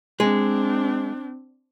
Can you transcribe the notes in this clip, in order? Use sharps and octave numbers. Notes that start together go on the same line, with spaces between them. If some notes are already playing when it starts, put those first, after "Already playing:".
G#3 C4 D4